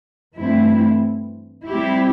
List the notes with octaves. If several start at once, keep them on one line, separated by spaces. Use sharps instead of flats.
G2 E3 A3 C4 E4
G3 C4 E4 G4